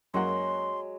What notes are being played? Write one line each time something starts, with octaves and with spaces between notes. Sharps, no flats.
F#2 F#3 G#3 A#3 F#5 C6